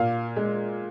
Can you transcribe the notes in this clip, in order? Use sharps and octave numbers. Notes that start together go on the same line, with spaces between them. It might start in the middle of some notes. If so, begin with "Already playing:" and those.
Already playing: A#2 F5
G#3